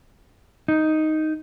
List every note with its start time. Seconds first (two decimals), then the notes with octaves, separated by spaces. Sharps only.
0.68 D#4